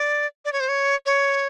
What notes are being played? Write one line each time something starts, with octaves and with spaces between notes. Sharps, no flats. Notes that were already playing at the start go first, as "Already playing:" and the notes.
Already playing: D5
D5
C#5
C5
C#5
C#5